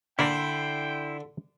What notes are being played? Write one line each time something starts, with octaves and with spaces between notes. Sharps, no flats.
D3 A#3 D4 E4 A#4 G5 B5 C6